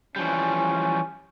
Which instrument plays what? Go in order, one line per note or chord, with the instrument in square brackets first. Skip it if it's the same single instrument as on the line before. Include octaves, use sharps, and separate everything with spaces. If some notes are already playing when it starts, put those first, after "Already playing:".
[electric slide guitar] E3 F3 G3 [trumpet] C#4